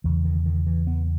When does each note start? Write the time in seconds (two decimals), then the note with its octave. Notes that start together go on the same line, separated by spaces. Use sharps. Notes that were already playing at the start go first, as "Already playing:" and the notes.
0.04 E2 C#3 E3
0.25 D#3
0.46 D#3
0.66 E3
0.87 B3